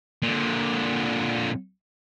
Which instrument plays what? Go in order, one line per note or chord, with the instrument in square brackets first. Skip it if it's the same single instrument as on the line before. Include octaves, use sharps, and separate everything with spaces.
[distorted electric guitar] A#2 D3